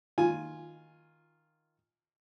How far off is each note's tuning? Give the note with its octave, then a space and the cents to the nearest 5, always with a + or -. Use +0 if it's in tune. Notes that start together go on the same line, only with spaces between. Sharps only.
D#3 +0 F4 +0 G#5 +0